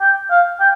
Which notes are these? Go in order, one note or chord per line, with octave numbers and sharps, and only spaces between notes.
G5
F5
G5